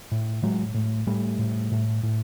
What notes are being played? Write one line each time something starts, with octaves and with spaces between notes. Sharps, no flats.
A2
A2 F#3 G#3
A2
A2 G3 A3
A2
A2
A2